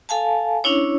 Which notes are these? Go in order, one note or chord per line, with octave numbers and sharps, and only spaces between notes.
A4 F5 G#5 A5
C#4 D4 E4 C#5